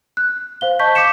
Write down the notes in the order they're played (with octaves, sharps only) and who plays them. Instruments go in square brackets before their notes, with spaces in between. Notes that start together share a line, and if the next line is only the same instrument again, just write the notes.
[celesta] F#6
C5 F5 G7
D#5 A5 C#6 G6 B6
D6 G6 B6 C#7 E7